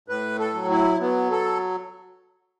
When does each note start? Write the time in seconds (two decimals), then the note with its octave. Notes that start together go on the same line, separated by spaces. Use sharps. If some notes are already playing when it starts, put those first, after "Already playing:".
0.08 A2 B4
0.39 A4
0.54 F#3
0.70 E4
1.00 F#3 B3
1.31 A4